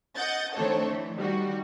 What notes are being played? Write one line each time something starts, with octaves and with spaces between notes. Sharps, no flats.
D#5 F#5 G6 A6
D#3 A3 C4 D4 A4 C#5
E3
D#3 G3 F#4